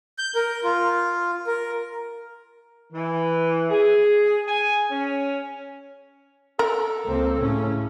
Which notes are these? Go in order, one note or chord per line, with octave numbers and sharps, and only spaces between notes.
G6
A#4
F4
A#4
E3
G#4
G#5
C#4
A4 A#4
C#2 A#3 C4
A2 C#3 C#4